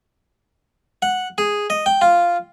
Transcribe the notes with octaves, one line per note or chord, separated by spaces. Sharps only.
F#5
G#4
D#5
G5
F4